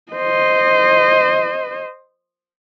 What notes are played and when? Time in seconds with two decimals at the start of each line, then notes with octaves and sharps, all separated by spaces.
0.12 C5 D#5